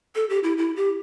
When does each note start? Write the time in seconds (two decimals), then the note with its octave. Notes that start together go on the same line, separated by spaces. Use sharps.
0.15 A4
0.30 G4
0.43 E4
0.58 E4
0.76 G4